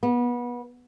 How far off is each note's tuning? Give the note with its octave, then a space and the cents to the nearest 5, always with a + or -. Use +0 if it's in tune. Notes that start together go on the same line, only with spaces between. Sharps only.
B3 -25